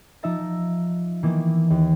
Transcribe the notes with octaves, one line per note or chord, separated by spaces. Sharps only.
F3 D#4 E5 A#5 A6
D#3 E3 A#3 B3
D#2